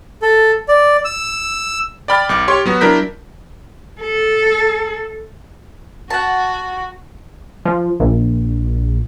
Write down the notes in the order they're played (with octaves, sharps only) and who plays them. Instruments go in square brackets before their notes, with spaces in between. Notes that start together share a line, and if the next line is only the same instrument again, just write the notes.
[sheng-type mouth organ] A4
D5
E6
[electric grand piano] D5 G5 B5 F6 A6
B1 D6
G4 C#5 C6 C#6
F#3 B3 F#4
F#3 D4 E4 A#4 G6 B6
[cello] A4
[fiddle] F#4 [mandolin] F#5 A5
[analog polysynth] F3
A#1